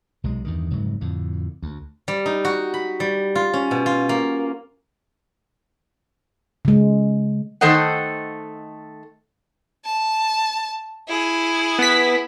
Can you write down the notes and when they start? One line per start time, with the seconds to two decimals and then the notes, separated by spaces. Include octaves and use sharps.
0.24 B1 C3 G#3
0.45 E2 G2 D#3
0.71 F1 G#2 C#3 F#3
1.01 F2 A2 D3
1.63 D2
2.08 G3
2.26 D#4
2.45 F#4
2.74 B5
3.00 G3
3.35 F4
3.53 C#4
3.71 B2
3.86 F4
4.09 A#3
6.65 C#3 G#3
7.61 D#3 A3 A4 C5 D#5 F#5
9.85 A5
11.09 E4 G#4
11.79 B3 B6